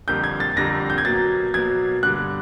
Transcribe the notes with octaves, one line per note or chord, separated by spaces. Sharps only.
F2 D3 G3 A#3 G6
G#6
A6
F2 D3 G3 A#3 A#6
G6
G#6
B2 F#3 A#3 A6
B2 F#3 A#3 G#6
G2 D3 G3 F#6